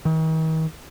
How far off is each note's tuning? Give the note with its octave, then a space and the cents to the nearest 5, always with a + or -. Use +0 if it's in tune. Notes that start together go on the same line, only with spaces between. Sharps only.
D#3 +45